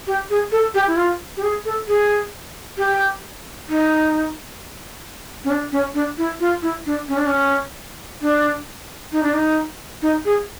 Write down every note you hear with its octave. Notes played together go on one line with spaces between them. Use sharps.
G4
G#4
A4
G4
E4
F4
G4
G#4
A4
G#4
G4
D#4
C#4
D4
C#4
D4
E4
F4
E4
D4
C#4
D4
C#4
D4
D#4
D4
D#4
D#4
G#4